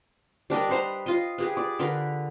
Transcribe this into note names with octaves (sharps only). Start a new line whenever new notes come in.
G3 D4 A#4 D#5
B4 C5 A#5
F4 D#5
G4 G#4 B4
D5
D3 A#4 B4